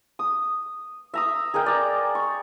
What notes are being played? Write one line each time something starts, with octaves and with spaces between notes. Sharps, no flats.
D#6
E5 A#5 D#6
G#4 A#4 D#5 G5
D5 A#5
C#6